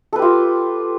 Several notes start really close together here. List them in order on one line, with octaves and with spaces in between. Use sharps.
A4 B4 G4 F4